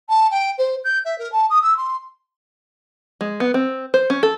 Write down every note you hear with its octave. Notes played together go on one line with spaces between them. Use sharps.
A5
G5
C5
G6
E5
A#4
A5
D#6
E6
C6
G#3
B3
C4
C5
C#4
A4